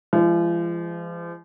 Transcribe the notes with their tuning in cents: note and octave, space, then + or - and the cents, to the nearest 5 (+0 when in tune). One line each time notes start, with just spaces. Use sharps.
F3 -40 G#3 -15